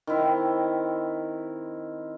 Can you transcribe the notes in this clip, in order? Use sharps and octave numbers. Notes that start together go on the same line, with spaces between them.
D#3 C4 E4